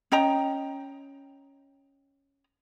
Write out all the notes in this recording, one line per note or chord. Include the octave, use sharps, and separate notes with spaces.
C#4 D#5 G5 A#5